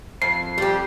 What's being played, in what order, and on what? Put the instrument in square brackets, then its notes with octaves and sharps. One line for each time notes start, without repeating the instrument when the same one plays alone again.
[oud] F2 [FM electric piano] C7
[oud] F2 G3 [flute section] G4